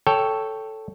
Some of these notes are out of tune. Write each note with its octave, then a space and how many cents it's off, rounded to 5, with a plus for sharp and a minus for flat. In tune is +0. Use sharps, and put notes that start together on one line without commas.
A4 +0 C#5 +0 G5 +0